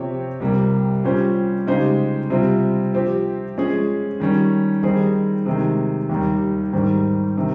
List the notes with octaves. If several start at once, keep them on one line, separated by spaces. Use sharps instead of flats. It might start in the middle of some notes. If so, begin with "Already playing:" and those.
Already playing: C3 F3 C4 G4 C#5
C2 C3 G3 A#3
A#2 G3 C#4 G4 C5
C#3 G#3 D#4 G4 C5
C3 G3 C4 F4
F3 C4 G4
F3 G#3 C#4 G#4
D#3 G3 C#4
D#3 G3 C4 D#4 G#4
C3 D#3 G#3
D#2 D#3 G3
G#2 D#3 G3
C3 D#3